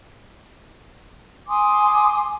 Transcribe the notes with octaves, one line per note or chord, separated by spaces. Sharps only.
G#5 C6 D6 D#6